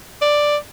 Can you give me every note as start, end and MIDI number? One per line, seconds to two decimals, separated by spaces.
0.22 0.57 74